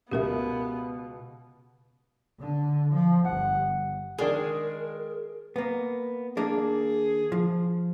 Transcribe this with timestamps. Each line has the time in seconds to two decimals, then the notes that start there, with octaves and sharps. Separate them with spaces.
0.11 C#2 B2 B3 G4 A#4 E5
2.38 D3
2.91 F3
3.25 G1 F#5
4.19 D#3 G#3 D4 G#4 A#4
5.56 A#3 B3
6.37 D#3 A#3 D4 G#4
7.32 F3